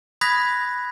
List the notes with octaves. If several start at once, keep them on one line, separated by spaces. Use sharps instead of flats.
B5 D#6 F#6 G#6 A#6 B6